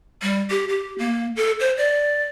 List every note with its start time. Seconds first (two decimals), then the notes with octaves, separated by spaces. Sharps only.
0.22 G3
0.50 G4
0.69 G4
0.98 A#3
1.36 A4
1.60 C5
1.77 D5